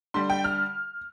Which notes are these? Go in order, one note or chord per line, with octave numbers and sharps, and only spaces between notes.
D3 G3 C6
G5
F6